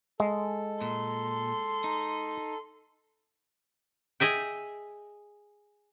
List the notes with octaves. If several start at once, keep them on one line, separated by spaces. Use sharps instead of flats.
G#3 A4
A#2 C6
D#4
G#4 D#5 E5 G5